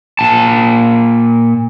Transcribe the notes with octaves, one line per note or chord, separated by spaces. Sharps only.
A#2 A5